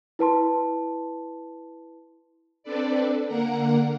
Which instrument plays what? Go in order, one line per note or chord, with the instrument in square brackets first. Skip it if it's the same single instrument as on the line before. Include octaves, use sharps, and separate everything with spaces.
[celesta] E4 B4 A5 C6
[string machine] C4 D4 A4 B4 D5
D3 A#3 A#4 F#5 A#5